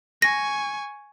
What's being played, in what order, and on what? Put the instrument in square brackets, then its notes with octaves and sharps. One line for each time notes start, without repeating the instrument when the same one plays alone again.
[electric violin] G#5 C#6 [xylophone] A#6